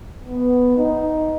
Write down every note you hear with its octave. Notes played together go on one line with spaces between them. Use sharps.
B3
D#4